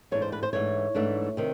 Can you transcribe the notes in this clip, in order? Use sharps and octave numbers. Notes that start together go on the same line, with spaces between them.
G#2 E3 A3 D4 C#5
C5
B4
C5
G#2 E3 A3 D4 C#5
G#2 E3 A3 D4
C3 D#3